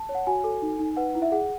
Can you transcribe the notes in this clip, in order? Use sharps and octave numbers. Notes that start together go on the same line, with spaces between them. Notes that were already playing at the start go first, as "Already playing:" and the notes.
Already playing: A5
C#5
F#5
F#4 G#5
A4
D#4
D#4
B4 F#5
E4
E5
G#4 F#5